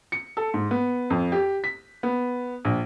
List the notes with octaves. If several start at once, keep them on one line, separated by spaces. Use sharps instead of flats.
C#7
A4
G#2
B3
F2
G4
B6
B3
A#1